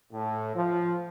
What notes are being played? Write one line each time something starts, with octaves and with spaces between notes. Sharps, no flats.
A2
F3